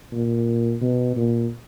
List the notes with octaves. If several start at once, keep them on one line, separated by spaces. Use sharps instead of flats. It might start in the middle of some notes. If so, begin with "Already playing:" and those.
A#2
B2
A#2